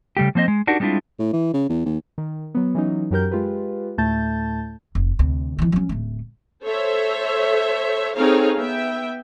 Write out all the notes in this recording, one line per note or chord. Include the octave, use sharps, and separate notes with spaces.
C#3 G3 A3 G4
F3 A#3 C4 C5 D#5
G#3
D4 D#4 F#4 G4 A#4
G3 G#3 C4 D4 E4 F4
A2
E3
C#3
E2
D#2
D#3
F#3 B3
E3 F#3 C#4 D#4
F#2 F#3 G4 A#4 G6
G#3 F4 G4 B4
D2 A2 A3 A5 G6 A6
F1
D2 C3
D#3 E3
F#3 C#4
D1 A3
A4 C5 C#5 E5
C4 D#4 G#4 A4 C#5 F5
B3 E5 G5